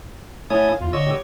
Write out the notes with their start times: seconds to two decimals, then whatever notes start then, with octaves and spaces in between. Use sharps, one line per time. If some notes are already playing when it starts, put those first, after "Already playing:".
0.50 A3 E4 C#5 F#5 G#5 D#6
0.68 F5
0.81 E2 F4
0.93 D3 C#5 D#5 E6
1.07 B3 G4